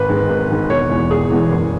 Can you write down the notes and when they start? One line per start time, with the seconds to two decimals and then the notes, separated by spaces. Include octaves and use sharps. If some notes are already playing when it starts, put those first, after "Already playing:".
Already playing: G#1 B4
0.09 G#2 G#3
0.29 G#1
0.50 G#2 G#3
0.70 E1 C#5
0.90 E2 E3 G#3
1.10 E1 G#4
1.30 E2 E3 G#3
1.51 F#1